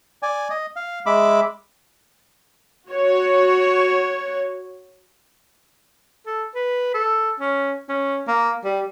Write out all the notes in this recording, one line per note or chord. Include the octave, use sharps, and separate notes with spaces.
D5 G#5
D#5
F5
G#3 E5 B5 D6
F#4 C#5
A4
B4
A4
C#4
C#4
A#3
G3